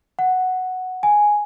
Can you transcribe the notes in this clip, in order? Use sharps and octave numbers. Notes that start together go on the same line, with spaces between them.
F#5
G#5